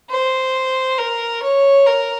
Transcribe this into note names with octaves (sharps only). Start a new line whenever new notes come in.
C5
A#4
C#5
A#4